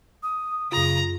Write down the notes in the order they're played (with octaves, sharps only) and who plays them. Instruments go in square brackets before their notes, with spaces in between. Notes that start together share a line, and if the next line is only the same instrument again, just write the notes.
[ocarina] D#6
[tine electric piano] F#2 F4 [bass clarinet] C#3 [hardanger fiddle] A#5